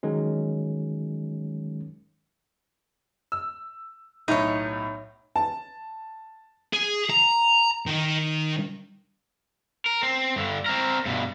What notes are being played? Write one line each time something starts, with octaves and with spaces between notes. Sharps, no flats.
D#3 F#3 G#3 C#4
E6
B1 A2 D#4 C#5
A5
G#4
A#5
D#3
A#4
C4
G2 D3
C4 A#4
G2 B2